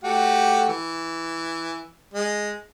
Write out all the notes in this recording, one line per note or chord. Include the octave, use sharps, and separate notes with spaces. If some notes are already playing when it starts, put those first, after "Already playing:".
A3 F#4 G4
E3
G#3